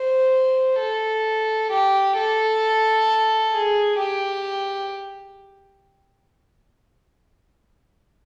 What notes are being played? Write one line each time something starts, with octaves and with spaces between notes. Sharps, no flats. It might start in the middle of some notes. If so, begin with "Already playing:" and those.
Already playing: C5
A4
G4
A4
G#4
G4